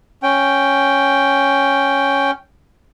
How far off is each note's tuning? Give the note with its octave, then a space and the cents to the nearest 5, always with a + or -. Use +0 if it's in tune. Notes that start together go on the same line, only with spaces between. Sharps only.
C#4 +0 G5 +0